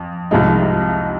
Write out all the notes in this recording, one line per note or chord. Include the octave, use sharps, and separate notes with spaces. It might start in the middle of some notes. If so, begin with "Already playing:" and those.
Already playing: F2
C2 C3 F3 G#3 D#4